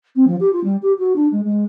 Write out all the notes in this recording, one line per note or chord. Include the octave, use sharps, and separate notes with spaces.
C4
F3
G4
F4
G3
G4
F#4
D4
G#3
G#3